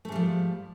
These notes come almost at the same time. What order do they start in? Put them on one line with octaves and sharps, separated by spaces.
A3 G#2 G3 F3